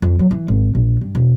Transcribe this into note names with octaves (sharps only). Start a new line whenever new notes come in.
F2
F#3
E3
G#1
A#1
G2
E1